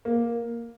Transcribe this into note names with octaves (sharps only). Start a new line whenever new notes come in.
A#3